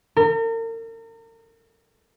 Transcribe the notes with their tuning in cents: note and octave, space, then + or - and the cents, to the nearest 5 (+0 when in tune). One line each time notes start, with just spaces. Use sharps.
A#4 -40